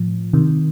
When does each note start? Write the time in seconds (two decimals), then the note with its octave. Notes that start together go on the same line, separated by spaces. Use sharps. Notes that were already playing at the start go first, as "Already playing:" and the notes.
Already playing: A2 F3
0.33 C3 D#3